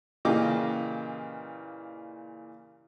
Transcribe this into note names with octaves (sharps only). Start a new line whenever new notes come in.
A#2 C#3 E3 G4 D#5 D6